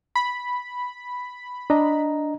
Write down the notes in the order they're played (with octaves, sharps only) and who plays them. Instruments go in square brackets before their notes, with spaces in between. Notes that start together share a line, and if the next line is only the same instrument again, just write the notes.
[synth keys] B5
[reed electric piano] D4 D#5 A#5